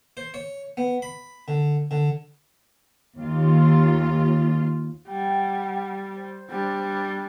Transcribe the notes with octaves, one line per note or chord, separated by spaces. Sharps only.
C5
C#5
B3
B5
D3
D3
D#2 F4
G3 F#5 G5
C5
G3 D4